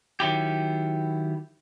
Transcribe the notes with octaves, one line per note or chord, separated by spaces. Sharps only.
D#3 F#3 E4 G4